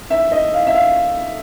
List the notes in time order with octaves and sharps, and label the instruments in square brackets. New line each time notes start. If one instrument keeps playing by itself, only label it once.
[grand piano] E5
D#5
F5
E5
F5